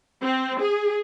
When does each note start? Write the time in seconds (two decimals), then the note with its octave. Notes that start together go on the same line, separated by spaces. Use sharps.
0.22 C4
0.61 G#4